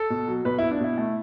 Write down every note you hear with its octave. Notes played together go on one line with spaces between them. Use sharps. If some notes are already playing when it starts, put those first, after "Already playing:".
Already playing: A4
B2
F#3
B2 B4
B2 E4
D4
B2 E4
A3